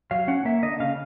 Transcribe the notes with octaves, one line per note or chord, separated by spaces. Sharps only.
F#3 F5
C#4 F#5
A#3 E5
D3 D#5
C#3 F5